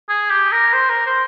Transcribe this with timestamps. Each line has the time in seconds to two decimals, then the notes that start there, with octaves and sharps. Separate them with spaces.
0.09 G#4
0.31 G4
0.52 A#4
0.73 C5
0.89 A#4
1.06 C5